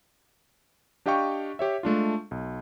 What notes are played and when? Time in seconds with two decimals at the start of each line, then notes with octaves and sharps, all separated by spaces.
1.06 D4 G4 D#5 F5 G5 C#6
1.59 G4 C#5 E5
1.83 G#3 A3 D4 F4
2.31 B1